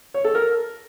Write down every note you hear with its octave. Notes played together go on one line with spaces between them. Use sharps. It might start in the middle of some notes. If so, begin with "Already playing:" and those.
C#5
A4
A#4